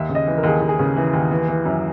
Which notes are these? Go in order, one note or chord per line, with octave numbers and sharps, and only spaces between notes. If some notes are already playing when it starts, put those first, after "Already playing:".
Already playing: D#2 E5
C#3
D#5
E3
A#4
D#2 G#4
D#2
G#4
C#3
E3
D#2
E3
E3
F#2